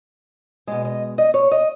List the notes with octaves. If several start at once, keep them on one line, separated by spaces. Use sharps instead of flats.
B2 G#3 D#5
D#5
D#5
C#5
D#5